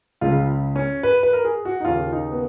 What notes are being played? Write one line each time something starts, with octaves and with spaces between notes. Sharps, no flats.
C#2 C#3 F4
C#4
B4
B4
A#4
G#4
F#4
D#4
D#2 C#3 F4
D#4
B3